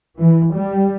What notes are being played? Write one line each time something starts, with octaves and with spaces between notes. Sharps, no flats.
E3
G3